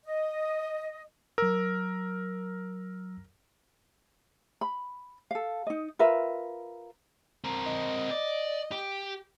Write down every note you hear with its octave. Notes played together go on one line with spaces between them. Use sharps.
D#5
F#3 A#4 E6
B5
A4 F5
D#4 D#5
F4 A#4 B4 E5
C4 A#4
D#5
D5
G4